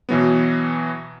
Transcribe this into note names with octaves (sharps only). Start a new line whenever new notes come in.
B2 E3 F#3 B3